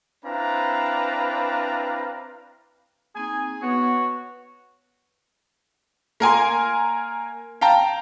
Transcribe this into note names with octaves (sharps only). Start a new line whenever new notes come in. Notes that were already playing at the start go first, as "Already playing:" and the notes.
C4 D4 E4 B4 F5 A#5
A#3 C4 D#4 G#4 G#5
B3 F#4 B4 C#5
A#3 A#4 G#5 C6
F5 G5 A5 A#5